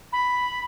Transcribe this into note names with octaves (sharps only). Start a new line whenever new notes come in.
B5